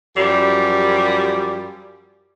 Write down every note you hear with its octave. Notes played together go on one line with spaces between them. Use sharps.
F#2 F3 G3 G4